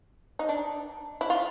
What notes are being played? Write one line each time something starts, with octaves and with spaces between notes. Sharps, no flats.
D#4
D4
E4
F4